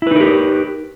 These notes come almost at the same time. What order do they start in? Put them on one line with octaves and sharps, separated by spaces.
E4 B4 D#4 A#4 G4